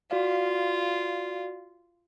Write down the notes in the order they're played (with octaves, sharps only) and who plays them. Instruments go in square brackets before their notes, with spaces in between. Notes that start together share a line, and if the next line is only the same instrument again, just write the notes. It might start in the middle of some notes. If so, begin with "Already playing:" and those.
[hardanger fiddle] F4 [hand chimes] F#4 D5 F5